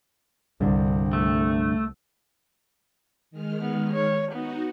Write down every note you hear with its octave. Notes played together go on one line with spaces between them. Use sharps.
C2 G2 D3
A3
D#3 G#3 F6
B3
C#5
B3 D#4 F#4